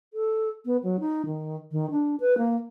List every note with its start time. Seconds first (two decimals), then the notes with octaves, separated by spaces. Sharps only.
0.13 A4
0.65 B3
0.83 F#3
1.00 D#4
1.26 D#3
1.72 D#3
1.91 D4
2.20 B4
2.38 A#3